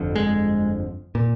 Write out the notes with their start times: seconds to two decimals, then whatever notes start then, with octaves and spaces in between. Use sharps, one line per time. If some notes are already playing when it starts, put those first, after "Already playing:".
Already playing: G1 F2 D3
0.16 G#3
1.15 A#2